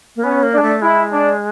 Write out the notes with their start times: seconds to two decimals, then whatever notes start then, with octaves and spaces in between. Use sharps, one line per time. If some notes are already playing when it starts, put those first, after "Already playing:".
0.16 A#3
0.24 B3 C#4
0.43 A#3
0.53 D4
0.58 G#3
0.62 A3
0.82 G#3 E4
1.12 D4